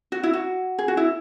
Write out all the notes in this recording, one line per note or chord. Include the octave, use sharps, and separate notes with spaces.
F#4
E4
F#4
G#4
F#4
E4